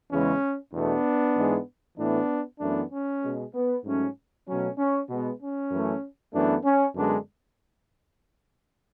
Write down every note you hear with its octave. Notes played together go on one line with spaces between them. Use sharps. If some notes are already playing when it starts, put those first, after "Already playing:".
E2 C#3 E3 G#3 C#4
E2 B2 A3 B3 D4
G#2 E3 G#3
A2 E3 A3 B3 D4
F#2 E3 A3 B3 D4
C#4
B2 G#3
B3
G#2 F#3 A3 C#4
B2 F#3 A3 C#4
C#4
B2 G#3 B3
C#4
F#2 E3 A3
F#2 E3 A3 B3 D4
C#4
F#2 D3 G#3 B3 D4